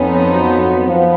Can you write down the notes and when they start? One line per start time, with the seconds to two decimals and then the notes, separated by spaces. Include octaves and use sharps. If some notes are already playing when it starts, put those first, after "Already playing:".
Already playing: F2 F3 B3 C#4 D#4
0.33 F#3
0.86 F3 B3